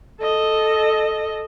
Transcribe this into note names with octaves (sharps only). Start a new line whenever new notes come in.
A4 D#5